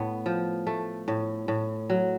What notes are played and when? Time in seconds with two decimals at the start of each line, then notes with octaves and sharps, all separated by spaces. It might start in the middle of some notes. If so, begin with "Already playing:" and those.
Already playing: A2 B3
0.26 F3
0.67 A3
1.08 A2
1.48 A2
1.90 F#3